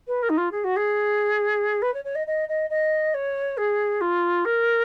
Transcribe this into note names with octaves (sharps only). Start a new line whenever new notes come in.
B4
A#4
D#4
F4
G#4
F#4
G#4
B4
C#5
C#5
D#5
D#5
D#5
D#5
C#5
G#4
F4
A#4